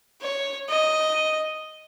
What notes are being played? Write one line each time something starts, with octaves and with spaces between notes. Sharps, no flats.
C#5
D#5